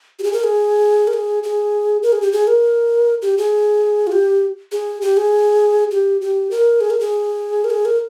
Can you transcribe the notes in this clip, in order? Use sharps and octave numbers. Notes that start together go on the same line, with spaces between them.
G4
G#4
A#4
G#4
A#4
G#4
G#4
A#4
G#4
G4
G#4
A#4
G4
G#4
F4
G4
G#4
G4
G#4
G4
G4
A#4
G#4
A#4
G#4
A#4
G#4
A#4